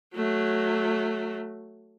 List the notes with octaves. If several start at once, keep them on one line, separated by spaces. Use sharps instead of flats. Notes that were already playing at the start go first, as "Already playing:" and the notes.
F#3 A3